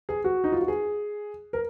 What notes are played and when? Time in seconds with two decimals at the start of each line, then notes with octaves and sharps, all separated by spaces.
0.09 G#4
0.24 F#4
0.44 D#4
0.52 F4
0.61 F#4
0.68 G#4
1.53 A#4